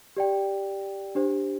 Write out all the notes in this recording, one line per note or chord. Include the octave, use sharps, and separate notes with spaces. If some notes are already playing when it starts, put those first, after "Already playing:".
G4 D5 G5
D4 G4 C5